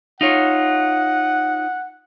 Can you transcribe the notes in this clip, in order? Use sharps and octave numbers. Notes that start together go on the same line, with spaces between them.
D#4 F4 C#5 F#5